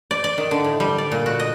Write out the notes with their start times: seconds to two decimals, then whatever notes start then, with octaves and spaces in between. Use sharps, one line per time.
0.11 D5
0.24 D5
0.38 D#3
0.51 D3
0.64 A2
0.80 G3
0.98 D5
1.12 A#2
1.26 F#4
1.40 D#5